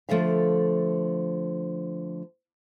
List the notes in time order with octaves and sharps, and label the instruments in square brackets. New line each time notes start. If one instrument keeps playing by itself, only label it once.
[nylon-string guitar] D3 F3 A3 A4 E5 F5